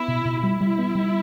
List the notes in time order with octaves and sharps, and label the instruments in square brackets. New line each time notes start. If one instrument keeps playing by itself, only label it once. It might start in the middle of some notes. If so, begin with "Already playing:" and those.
Already playing: [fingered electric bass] B3 [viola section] E4
[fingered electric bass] B2
B2
[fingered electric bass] G3 [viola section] E4
[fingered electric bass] G3
B3
G3